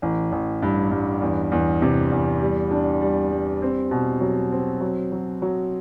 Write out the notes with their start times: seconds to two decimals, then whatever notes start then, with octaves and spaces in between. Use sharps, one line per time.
0.02 A1
0.32 A1
0.62 G2
0.91 G2
1.21 E2
1.52 E2
1.82 C3
2.11 E2
2.42 G3
2.71 D4
3.01 G3
3.32 G3
3.62 C4
3.91 B2
4.21 F#3
4.52 C4
4.81 F#3
5.12 F#3
5.42 F#3